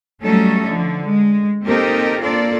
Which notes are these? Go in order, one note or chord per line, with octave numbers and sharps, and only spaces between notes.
F#3 G3 A3 C#4 D#4 A4
D3 F3
G#3
A#3 C4 D#4 G4 A4 A#4
A#3 D4 F4 A4 D5